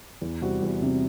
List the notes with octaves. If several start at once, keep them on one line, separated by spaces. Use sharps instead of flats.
E2
C3 G3 C4 F#4
E2
C3 G3 C4 F#4